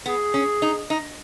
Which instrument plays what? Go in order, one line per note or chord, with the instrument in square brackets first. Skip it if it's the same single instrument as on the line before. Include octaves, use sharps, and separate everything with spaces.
[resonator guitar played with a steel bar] B3 [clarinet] G#4
[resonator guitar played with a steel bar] C#4
D#4
D#4